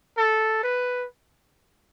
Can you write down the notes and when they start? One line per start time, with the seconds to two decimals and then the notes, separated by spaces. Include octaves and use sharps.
0.17 A4
0.63 B4